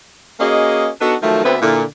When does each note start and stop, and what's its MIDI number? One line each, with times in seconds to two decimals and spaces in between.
0.40 0.88 58
0.40 0.88 61
0.40 0.88 66
0.40 0.88 68
0.40 0.88 75
1.00 1.16 59
1.00 1.16 62
1.00 1.16 63
1.00 1.16 66
1.00 1.16 69
1.00 1.16 71
1.22 1.44 51
1.22 1.44 53
1.22 1.44 54
1.22 1.44 57
1.44 1.56 38
1.44 1.56 50
1.44 1.56 59
1.44 1.56 60
1.44 1.56 71
1.44 1.56 76
1.62 1.83 46
1.62 1.83 50
1.62 1.83 64